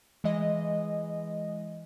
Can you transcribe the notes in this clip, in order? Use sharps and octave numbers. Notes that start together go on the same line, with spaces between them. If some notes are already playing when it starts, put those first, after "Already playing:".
E3 G#3 D#5